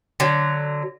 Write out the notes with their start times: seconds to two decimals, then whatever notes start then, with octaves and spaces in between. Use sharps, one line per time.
0.20 D3 F#3